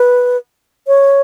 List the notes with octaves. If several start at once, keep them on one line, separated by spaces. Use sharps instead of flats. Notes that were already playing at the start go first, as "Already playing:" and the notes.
Already playing: B4
C#5